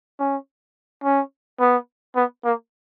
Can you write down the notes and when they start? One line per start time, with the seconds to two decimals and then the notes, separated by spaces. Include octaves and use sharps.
0.19 C#4
1.04 C#4
1.60 B3
2.16 B3
2.45 A#3